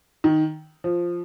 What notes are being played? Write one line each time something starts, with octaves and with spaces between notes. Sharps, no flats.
D#3
F3